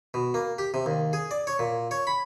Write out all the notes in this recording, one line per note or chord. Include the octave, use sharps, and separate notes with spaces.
B2
A#3
G4
C3
D#2
G#4
D5
C#5
A#2
C#5
B5